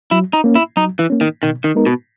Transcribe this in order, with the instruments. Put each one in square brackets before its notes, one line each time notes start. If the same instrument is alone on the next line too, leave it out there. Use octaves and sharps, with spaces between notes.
[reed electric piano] F#3 [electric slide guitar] E4
[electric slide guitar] D#4
[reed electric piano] A#3 C#4
[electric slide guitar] E4
[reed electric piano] F#3 [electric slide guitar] D#4
[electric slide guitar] E3
[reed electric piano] A#3 C#4
[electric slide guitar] D#3
[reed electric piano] B2 [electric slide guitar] D#3
[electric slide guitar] D#3
[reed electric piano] G#3 B3 D#4 A#4
[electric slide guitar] B2